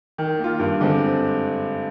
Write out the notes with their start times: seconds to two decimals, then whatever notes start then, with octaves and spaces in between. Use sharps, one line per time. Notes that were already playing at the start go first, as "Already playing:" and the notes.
0.18 D#3
0.39 A#3 F4
0.60 G2
0.81 D3 G#3 C4